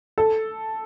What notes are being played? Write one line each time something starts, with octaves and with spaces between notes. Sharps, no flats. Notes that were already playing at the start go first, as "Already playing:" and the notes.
A4